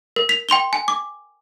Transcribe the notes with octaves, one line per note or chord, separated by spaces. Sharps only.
A#4
B6 F7
G5 C6 F7 G7
G#5
D6